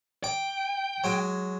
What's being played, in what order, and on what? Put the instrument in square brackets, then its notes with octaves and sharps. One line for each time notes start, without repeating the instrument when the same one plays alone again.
[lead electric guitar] G5 [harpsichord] D6
[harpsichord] F#3 G#3 G#5